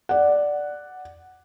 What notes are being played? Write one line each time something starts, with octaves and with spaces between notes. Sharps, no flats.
D5 F#5